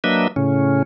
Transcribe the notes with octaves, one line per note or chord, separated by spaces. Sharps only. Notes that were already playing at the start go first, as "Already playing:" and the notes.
F#3 A#3 D4 B4 D#5 E5
A2 C#3 C#4